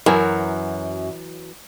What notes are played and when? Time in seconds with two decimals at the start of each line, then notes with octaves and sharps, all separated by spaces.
0.06 F#2 E3 F#3 A#4